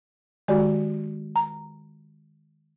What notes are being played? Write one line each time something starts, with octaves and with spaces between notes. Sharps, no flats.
D#3 G#3 F#4 G4 D5
A#5